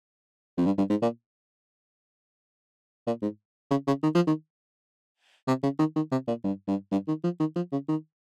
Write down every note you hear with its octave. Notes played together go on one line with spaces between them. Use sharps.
F2
G2
G2
G#2
A#2
A#2
G#2
C#3
C#3
D#3
F3
D#3
C3
C#3
D#3
D#3
C3
A#2
G2
G2
G2
D#3
F3
D#3
F3
C#3
D#3